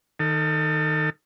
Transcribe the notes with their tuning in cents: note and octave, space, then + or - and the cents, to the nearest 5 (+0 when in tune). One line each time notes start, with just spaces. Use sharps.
D#3 +0 A4 +30